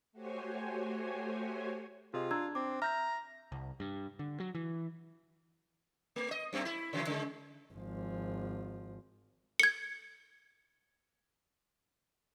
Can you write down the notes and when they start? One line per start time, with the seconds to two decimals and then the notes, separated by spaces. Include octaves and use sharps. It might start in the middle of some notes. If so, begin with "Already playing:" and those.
0.12 A3 F#4 G4 C5 C#5 G#5
2.14 C3 F4 G#4 D#5
2.31 D4 A#5 E6 G#6
2.55 C4 D6
2.82 E5 A#5 F6 G6 A#6
3.52 C2
3.80 G2
4.19 D3
4.40 F#3
4.55 E3
6.16 A3
6.31 D#5
6.53 F#2 A3 C4
6.65 E4
6.93 C#3 E3 F#3
7.07 C#3 G#3
7.74 G#1 F3
9.60 G#6 C#7